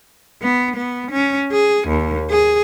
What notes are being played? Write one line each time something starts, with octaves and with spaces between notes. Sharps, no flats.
B3
B3
C#4
G#4
D#2
G#4